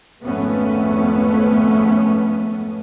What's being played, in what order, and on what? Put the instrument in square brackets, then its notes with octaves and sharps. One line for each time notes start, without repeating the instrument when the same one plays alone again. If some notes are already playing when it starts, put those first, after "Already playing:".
[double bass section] G#1 F2 G#2 A3 B3 C#4